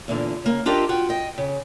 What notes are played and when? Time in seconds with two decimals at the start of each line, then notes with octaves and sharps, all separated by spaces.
0.08 E2 A#2 D3
0.44 C#3 A#3
0.66 D4 F4 G4 A#4 D#5 E5
0.89 F4 F#4 G5
1.09 D#5 G5
1.38 C#3